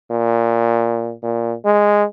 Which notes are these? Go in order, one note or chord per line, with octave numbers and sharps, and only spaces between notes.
A#2
A#2
G#3